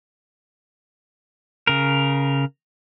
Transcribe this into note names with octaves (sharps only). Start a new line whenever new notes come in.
C#3 A#4